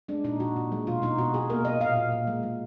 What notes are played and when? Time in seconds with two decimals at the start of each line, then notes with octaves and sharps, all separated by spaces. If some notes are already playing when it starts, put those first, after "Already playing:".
0.08 G#3 D4
0.24 A#2 D#4
0.40 A#2 F#4
0.56 A#2
0.72 G#3
0.87 B2 F4
1.02 B2 D#4
1.18 B2 F#4
1.34 B2 G#4
1.50 A#3 A#4
1.65 B2 D#5
1.81 A#2 F5
1.96 A#2
2.12 A#2
2.27 G#3
2.43 G#3